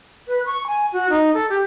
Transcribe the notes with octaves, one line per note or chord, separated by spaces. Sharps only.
B4
C#6
G#5
F#4
D#4
A4
G4